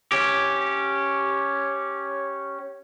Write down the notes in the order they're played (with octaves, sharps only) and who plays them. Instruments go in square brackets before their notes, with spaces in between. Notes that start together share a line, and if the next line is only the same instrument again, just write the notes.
[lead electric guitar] C#4 G4